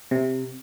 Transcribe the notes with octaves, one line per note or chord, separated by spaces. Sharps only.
C3